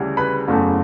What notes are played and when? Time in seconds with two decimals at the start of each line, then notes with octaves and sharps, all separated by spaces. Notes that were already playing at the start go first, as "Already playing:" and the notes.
Already playing: D2 C#3 E3 G3
0.17 B4 B5
0.48 F#1 E2 C#3 F#3 A3